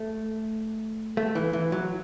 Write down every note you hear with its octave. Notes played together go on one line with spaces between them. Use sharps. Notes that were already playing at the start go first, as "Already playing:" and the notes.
Already playing: A3
A3
E3
E3
F#3